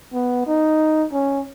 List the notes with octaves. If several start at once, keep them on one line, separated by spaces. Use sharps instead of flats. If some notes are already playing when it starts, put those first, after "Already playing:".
B3
D#4
C#4